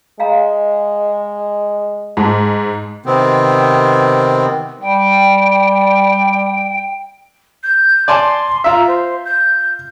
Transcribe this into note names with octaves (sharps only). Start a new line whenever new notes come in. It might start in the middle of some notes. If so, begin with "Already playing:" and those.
G#3 F5 A#5
G#2 A5
C3 D#3 B3 C4
G3 G5
G6
D5 G#5 A5 C6
F4 E5 A#5
C5
G6